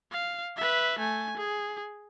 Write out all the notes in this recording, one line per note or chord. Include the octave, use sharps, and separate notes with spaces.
F5
B4 E5
A3 G#5
G#4